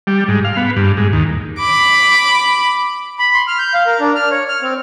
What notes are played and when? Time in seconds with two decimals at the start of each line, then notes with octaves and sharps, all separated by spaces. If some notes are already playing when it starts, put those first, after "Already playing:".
0.07 G3
0.28 G#2
0.45 F5
0.57 B3
0.76 G2
0.97 G#2
1.13 D#2
1.59 B5 D6
3.19 B5
3.34 C6
3.48 F6
3.59 G6
3.74 F5
3.86 A#4
4.00 D4
4.15 F6
4.31 C#5
4.49 F6
4.62 C4